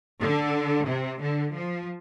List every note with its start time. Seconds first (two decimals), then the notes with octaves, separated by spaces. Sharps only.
0.19 D3
0.87 C3
1.21 D3
1.55 F3